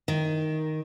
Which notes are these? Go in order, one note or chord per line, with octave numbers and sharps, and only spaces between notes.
D#3